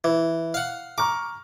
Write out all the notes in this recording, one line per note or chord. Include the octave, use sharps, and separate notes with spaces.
E3
F5 F#5
A#5 C#6 D6 F6